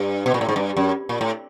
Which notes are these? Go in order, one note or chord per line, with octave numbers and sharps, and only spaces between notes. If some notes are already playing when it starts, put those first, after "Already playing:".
Already playing: G2
B2
A#2
A2
G#2
G2
F#2
A#2
A2